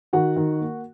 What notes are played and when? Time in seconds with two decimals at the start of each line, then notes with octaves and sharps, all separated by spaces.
0.13 D#3 F#4 F#5
0.36 D#3
0.61 A#3